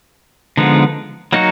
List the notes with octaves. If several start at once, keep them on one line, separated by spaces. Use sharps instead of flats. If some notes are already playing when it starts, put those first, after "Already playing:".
D3 F3 G#3 B3 D#4
F#3 A#3 D#4 F#4